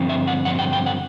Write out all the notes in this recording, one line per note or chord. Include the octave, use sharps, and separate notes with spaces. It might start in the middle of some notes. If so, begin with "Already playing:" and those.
Already playing: G2 D3 F3 C4
E5
F#5
G2 D3 F3 C4 F#5
G5
G5
F#5